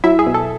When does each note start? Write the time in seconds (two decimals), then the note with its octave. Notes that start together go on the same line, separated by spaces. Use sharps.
0.04 F#3 E4 E5
0.19 G#4
0.27 B2
0.34 A4